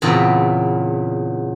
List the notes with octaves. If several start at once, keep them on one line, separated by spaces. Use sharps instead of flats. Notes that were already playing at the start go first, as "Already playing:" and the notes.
E2 A#2 C#3 B3 C4 F#4